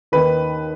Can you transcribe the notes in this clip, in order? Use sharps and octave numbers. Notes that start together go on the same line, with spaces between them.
D#2 D#3 B4